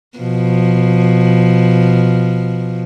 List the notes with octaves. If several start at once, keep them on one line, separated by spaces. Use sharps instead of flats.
B2 F3